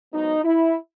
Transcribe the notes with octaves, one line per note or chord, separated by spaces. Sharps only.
G#2 F#3 B3 D#4
E4